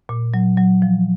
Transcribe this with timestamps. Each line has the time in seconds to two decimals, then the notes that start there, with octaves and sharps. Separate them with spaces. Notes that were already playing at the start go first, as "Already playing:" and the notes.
0.09 A#2
0.34 F#3
0.58 F#3
0.82 F3